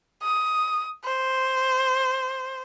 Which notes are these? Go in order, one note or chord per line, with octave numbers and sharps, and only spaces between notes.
D#6
C5